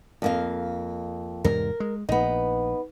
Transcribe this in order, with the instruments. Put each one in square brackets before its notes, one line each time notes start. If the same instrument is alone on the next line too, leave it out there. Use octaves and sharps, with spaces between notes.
[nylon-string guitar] F2 A#3 F5
[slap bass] E2 G#2 C3 [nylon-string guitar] A#4
[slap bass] G#3
[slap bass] A#1 [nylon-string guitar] B3 D#4